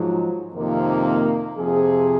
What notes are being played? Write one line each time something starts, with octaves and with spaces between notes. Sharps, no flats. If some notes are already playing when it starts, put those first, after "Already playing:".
Already playing: G#2 F3 F#3
F2 C3 D#3 A#3
F2 C3 F3 G#4